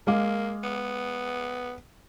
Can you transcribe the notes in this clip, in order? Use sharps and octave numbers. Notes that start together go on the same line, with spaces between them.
G#3 A#3 F5 D6
B3